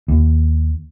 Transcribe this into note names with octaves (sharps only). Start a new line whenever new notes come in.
D#2